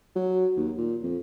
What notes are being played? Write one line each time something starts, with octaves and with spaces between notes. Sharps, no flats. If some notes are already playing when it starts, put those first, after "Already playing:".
F#3
D#2
A#2
F2